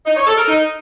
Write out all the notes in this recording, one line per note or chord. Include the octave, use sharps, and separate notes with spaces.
D#4
C#5
A4
A#4
D#4